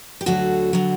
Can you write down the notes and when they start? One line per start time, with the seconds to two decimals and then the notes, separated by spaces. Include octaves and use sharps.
0.21 G4
0.26 D2 D3 F#3 F#4 A4
0.73 D3 F#3